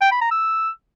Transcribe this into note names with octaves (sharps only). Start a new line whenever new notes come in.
G5
B5
A#5
E6